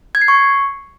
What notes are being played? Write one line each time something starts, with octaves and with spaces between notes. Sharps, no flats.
G#6
C7
C#6